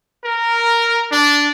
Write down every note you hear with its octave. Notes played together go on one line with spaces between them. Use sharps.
A#4
D4